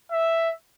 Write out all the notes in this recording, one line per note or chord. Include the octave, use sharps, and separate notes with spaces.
E5